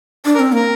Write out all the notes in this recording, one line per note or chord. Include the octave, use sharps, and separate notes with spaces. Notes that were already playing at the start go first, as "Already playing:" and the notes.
D4
A#4
C4
A#3 A#4